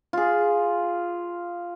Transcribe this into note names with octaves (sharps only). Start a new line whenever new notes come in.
F4 G#4